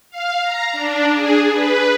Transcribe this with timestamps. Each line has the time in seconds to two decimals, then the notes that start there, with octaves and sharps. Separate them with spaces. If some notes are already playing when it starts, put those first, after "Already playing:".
0.10 F5
0.43 A#5
0.73 D4
1.14 G#4
1.51 B4